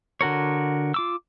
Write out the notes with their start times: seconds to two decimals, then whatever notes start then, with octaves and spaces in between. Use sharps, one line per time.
0.21 D3 F#4 A#4 C#5
0.94 F4 D6 E6